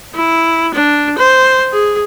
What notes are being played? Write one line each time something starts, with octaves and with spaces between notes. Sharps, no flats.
E4
D4
C5
G#4